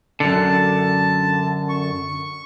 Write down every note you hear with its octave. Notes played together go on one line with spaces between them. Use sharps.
F#2 D3 A5
C#6